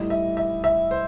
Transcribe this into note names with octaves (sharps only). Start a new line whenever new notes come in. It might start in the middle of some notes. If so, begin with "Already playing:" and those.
Already playing: A2 G3 D#4 D#5
E5
E5
E5
C5